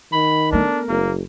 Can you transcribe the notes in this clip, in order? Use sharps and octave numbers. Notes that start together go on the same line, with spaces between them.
D#3 B5
A3 B3 D4 A#4
F#1 A#3